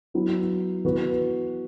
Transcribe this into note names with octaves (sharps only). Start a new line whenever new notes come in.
F#3 B3 E4
E3 B3 F#4 B4